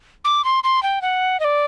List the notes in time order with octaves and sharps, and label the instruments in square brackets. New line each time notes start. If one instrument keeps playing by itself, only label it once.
[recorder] D6
C6
C6
G5
F#5
D#5
D5